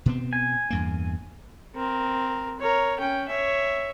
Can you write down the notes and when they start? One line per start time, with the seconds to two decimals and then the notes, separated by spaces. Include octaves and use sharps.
0.06 B2 B3 C4
0.33 G#5
0.70 E2 G2 A#3
1.75 C4 A#4
2.60 A#4 C#5
3.00 C#4 G5
3.29 C#5 E5